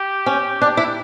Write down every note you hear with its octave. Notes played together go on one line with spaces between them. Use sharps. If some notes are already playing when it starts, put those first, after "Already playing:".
Already playing: G4
C#4
D4
E4